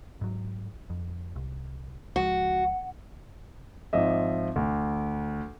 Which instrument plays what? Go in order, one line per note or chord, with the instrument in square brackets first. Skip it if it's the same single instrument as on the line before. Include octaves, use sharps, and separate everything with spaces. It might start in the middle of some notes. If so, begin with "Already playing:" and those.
[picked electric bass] G#2 F#3
F2
C2
[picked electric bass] C#2 F3 G#3 [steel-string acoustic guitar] F#4
[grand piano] G#1 F3 D#5 E5
D2